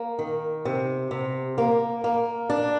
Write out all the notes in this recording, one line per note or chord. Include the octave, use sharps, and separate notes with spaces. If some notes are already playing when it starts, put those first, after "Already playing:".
Already playing: A#3
D#3
C3
C3
A#3
A#3
D4